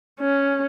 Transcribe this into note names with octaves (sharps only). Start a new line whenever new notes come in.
C#4